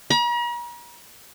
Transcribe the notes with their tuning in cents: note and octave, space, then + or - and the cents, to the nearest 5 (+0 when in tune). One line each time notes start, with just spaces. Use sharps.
A#5 +45